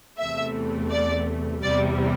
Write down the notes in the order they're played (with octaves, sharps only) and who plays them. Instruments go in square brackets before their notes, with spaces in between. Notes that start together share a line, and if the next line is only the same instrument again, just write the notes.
[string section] E2 C3 E3 A3 E5
D5
E2 C3 G3 D5